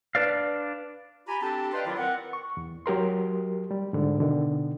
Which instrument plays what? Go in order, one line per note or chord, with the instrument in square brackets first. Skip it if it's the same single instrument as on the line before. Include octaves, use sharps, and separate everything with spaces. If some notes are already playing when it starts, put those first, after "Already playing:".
[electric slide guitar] D4 B4 D5 F5
[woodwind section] F4 G4 G#5 A#5 B5
C4 D4 G4 A4 A5
B4 D5 D#5 F5 G5 C6
D#3 F#3 E4 F4 D5
C4 A#4 B4 F#5
[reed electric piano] C#6
E2
F#3 G4 A#4 C6
G3
G#2 D3
B2 D3 D#3